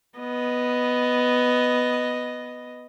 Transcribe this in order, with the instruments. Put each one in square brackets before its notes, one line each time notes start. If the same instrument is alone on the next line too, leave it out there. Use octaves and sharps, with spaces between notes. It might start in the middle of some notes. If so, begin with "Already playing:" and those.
[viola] B3 D#5